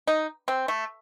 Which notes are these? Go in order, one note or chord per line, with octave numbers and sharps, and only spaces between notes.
D#4
C4
A3